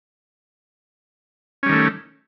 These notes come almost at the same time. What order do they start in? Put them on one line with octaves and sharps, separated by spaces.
C#4 G3 D#3 A3